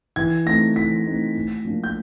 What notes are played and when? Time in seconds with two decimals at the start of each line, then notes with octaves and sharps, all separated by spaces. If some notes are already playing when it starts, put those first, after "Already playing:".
0.16 E3 G#6
0.46 A3 C4 D#4 A#6
0.76 E3 B6
1.06 A3 C4 D#4
1.35 A2
1.65 F3 A#3 D4
1.84 G6